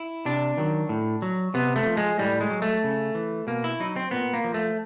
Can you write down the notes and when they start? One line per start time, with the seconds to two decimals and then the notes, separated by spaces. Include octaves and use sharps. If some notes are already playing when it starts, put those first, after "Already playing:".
Already playing: E4
0.25 C3 D4
0.58 D#3 F#3
0.89 A2
1.22 F#3
1.54 C3 B3
1.76 A3
1.86 F3
1.97 G#3
2.19 A2 G3
2.41 G#3
2.50 F#3
2.62 A3
2.84 C#3
3.15 E3
3.47 B2 A#3
3.64 E4
3.80 F#3 D#4
3.96 C4
4.11 A#2 B3
4.34 A#3
4.44 F3
4.54 A3